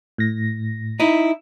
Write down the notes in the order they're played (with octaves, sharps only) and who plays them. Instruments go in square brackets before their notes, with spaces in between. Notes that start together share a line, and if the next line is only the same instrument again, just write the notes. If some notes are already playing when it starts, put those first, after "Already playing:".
[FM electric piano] A2 A#6
[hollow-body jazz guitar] D#4 E4